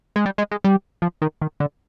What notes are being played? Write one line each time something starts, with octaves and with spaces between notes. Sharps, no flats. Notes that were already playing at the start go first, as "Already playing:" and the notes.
G#3
G3
G#3
G#3
G3
F3
D#3
D#3
D3